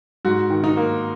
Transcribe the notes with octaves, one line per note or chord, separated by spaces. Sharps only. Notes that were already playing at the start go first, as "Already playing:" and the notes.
G#2 F#4
D#3
D#4
A#3